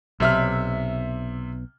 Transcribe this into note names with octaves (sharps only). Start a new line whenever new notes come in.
B1 C3 E5 F6